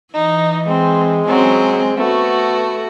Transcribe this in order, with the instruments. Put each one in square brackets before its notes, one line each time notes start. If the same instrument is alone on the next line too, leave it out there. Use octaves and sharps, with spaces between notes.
[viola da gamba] E3 [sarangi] D#4
[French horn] G#3 [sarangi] C4
[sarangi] F#3 [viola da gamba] C4 C#4
[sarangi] A3 [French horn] B3 [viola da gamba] F#4